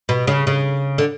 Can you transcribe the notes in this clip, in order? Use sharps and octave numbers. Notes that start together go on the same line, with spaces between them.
B2
C#3
C#3
D3